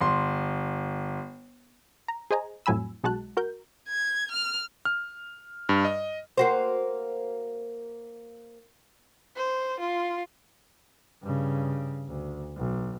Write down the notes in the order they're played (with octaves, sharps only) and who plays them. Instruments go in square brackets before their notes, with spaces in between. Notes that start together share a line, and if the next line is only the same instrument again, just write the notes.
[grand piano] G1 C6
[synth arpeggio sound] A#5
G#4 C5 D#5 G#5 A#5
F2 A2 F#3 G#5 B5 E6
B1 G#3 F#4 A5 F#6
F#4 A#4 G6
[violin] G#6
F6
[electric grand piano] F6
G2
D#5
[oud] A#3 F#4 C5
[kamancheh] C5
F4
[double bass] G2 C#3
D2
B1